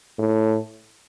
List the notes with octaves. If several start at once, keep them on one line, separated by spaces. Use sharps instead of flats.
A2